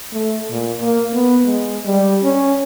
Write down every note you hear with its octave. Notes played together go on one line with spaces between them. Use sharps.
A3
A#2
A#3
B3
G#3
G3
C#4